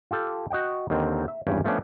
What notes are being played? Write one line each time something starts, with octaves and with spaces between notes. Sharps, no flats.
F4 G4 A4
F#4 D#5 F#5 G5
D#2 D3 D#3 C4
E5
G#1 E2 G2 C#4 B4 G5
F3 A3 B3 C#4 D4